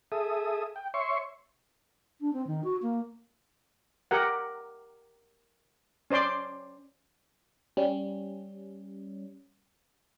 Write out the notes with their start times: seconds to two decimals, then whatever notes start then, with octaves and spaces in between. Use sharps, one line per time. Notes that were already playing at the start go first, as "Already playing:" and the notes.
0.12 G#4 A4 E5 D#6
0.76 G5
0.94 C#5 E5 C6 C#6
2.21 D4
2.33 C4
2.47 D#3
2.64 F#4
2.82 A#3
4.11 G4 A#4 F#5
6.10 C#4 C5 D5 C6 D6
7.77 G3 C#4